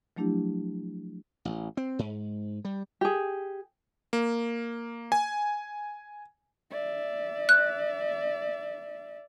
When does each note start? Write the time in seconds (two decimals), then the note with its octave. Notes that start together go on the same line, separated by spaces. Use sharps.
0.16 F3 F#3 A3 D4 E4 G4
1.45 A1
1.77 C4
1.99 G#2
2.65 G3
3.01 G4 G#4
4.13 A#3
5.12 G#5
6.71 D5 E5
7.49 F#6